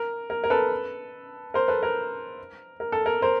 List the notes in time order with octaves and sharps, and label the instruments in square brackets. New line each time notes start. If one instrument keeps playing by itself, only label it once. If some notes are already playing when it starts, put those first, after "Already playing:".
Already playing: [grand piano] A#4
A#4
A#4
A4 B4
A#4 C5
A4 B4
A#4
A#4
A4
A#4
A#4 C5